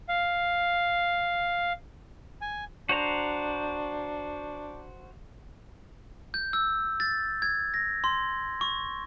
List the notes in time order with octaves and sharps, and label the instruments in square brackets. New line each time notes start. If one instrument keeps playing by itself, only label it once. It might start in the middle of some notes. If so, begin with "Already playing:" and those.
[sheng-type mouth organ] F5
G#5
[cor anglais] D4 [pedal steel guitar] F#4 C5 A#5
[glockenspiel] G6
E6
A6
G#6
A#6
C6
C#6